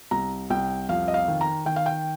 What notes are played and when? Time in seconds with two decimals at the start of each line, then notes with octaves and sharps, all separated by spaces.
0.11 C2 A#5
0.50 C2 G5
0.89 F2 F5
1.08 D#5
1.14 F5
1.28 D#3
1.41 A#5
1.66 D#3 G5
1.76 F5
1.86 G5